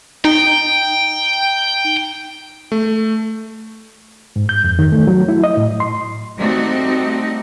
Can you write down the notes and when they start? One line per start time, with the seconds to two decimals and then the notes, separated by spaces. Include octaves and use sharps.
0.25 D#4 G5
2.72 A3
4.36 G#2
4.49 G6
4.64 F2
4.79 D#3
4.92 A3
5.07 F#3
5.29 E4
5.44 D#5
5.57 A2
5.80 C6
6.37 G3 A3 C4 D#4 F#4 D#5